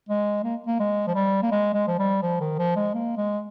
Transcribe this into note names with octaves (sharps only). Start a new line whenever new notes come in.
G#3
A#3
A#3
G#3
F3
G3
A#3
G#3
G#3
F3
G3
F3
D#3
F3
G#3
A#3
G#3